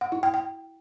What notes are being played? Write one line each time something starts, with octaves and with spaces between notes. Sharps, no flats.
F#5
E4
G5
G5